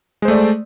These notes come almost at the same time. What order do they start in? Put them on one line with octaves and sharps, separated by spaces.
G#3 C5 A3 D5